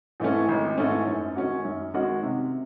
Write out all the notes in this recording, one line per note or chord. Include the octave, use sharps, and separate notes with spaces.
G#2 E3 A3 C#4
G#1
G#2 E3 A3 C#4
F#2
D#3 G#3 C#4 F#4
F#2
D#3 G#3 C#4 F#4
C3